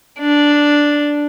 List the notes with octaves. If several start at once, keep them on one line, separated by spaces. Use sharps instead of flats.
D4